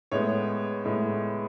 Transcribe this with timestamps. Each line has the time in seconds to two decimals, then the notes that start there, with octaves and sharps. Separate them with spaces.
0.12 A2 G#3 B3 C#5
0.85 A2 G#3 B3